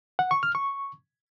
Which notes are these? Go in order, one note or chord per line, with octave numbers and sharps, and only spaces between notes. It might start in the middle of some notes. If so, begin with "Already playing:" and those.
F#5
C#6
F6
C#6